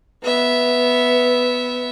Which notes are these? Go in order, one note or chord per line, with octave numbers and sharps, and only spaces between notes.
B3 E5